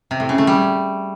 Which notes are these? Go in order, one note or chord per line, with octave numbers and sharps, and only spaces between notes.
C3
A2
C#3
A3
G3